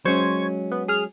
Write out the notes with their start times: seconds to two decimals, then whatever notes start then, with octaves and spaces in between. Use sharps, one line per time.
0.05 F#3 G#3 C#4 C5 C#6 G#6
0.72 B3
0.88 G#4 F6